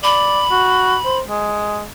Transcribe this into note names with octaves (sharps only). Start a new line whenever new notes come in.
D5 B5
F#4
C5
G#3